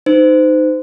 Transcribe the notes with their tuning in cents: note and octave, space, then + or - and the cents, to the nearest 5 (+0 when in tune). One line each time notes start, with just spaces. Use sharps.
D#4 -10 C5 -30